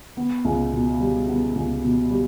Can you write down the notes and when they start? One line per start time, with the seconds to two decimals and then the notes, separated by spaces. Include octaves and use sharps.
0.17 B3
0.45 C#2
0.73 B2
1.00 G3
1.28 B3
1.55 C#2
1.83 B2
2.10 G3